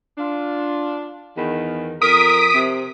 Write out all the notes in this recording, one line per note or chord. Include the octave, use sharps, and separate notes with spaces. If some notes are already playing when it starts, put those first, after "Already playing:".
D4 F4
E2 D#3
F2 A#4 D#6 B6 D7
C3